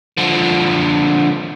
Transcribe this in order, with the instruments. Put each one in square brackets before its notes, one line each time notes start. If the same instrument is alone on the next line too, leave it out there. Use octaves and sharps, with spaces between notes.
[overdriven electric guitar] D3 F3